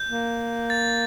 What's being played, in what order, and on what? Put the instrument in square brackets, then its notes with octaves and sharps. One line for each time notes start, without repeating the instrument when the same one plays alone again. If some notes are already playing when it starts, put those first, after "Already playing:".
Already playing: [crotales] G6
[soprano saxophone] A#3
[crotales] A6